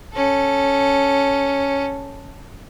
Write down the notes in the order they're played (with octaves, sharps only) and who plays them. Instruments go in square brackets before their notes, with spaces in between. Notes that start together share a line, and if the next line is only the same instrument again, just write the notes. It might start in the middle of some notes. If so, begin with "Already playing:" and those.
[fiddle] C#4 A4